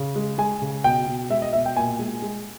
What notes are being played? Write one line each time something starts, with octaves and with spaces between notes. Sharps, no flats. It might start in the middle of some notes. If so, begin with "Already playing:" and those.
Already playing: C#3
G#3
G#3 G#5
C#3
B2 G5
B2
G#3 E5
D#5
B2 E5
G5
A#2 G#5
G#3
G#3